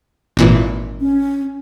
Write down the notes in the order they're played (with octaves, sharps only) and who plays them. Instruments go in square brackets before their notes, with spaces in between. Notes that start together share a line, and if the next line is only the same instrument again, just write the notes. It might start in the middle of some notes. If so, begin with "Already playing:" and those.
[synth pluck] G#1 A#2 E3
[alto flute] C#4